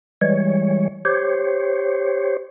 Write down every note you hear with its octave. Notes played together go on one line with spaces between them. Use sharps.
E3 G3 G#3 C#5
G4 C5 C#5